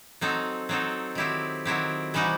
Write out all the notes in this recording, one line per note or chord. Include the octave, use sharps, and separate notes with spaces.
F#3 C4 D#4 A4
F#3 C4 D#4 A4
D#3 F#3 C4 E4 G4
D#3 F#3 C4 E4 G4
C3 E3 G3 D#4 F#4